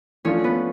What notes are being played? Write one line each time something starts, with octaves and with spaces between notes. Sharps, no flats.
F3 A3 C#4 D4 F4 C#5
B3 B4